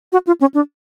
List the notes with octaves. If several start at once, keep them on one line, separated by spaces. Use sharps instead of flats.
F#4
F4
C#4
D4